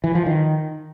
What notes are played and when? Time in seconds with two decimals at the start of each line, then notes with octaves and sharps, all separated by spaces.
0.04 E3
0.15 F3
0.26 D#3